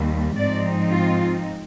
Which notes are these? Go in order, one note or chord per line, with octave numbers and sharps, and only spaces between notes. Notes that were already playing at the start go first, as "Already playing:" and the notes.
Already playing: D#2 D#3 G3
G#2 F3 C4 D#4 D5
F4